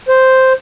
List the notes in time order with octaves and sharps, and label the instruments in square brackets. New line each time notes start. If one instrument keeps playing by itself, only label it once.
[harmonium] C5